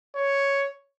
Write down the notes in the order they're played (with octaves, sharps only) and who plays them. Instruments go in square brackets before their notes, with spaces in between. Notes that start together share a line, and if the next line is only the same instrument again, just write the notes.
[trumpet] C#5